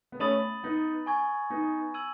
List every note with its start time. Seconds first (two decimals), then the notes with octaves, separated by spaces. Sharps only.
0.12 B3
0.19 A3 C#4 B5 D#6 A6 D#7 F#7
0.63 B3 D#4
1.06 G#5 C#6 G#6
1.50 B3 D#4
1.94 E6 G#6 D#7 F#7